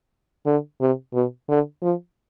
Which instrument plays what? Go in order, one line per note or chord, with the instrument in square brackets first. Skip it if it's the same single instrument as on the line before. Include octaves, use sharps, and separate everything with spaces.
[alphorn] D3
C3
B2
D3
F3